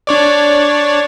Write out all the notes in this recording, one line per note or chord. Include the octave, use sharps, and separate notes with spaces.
D4 C#5 D5